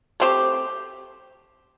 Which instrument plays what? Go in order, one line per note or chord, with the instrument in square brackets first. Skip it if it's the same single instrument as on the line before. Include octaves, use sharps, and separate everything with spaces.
[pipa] A3 C4 G4